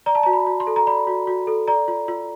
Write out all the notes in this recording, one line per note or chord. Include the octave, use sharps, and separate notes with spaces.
D5 A#5
A5
F#4 A#5
B5
F#4
C6
A4
A#5
D5 B5
F#4
F#4
A4
D5 A#5
F4
F4